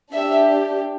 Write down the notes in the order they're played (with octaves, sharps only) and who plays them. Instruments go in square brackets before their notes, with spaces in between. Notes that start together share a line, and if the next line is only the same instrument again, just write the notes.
[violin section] D4 G4 E5